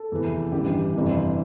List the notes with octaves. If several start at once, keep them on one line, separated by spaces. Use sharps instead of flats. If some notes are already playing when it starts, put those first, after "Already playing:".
Already playing: A4
F1 E2 C3 E3
A1 G2 E3 G4
G1 F2 C3 E3